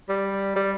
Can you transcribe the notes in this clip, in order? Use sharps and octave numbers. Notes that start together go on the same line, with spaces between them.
G3
G3